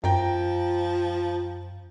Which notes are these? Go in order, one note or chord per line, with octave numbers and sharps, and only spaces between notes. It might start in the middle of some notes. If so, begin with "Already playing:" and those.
F#2 F3 G5 A#5